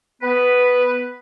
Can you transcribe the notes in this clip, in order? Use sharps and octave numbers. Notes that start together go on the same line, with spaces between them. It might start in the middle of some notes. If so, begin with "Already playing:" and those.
B3 B4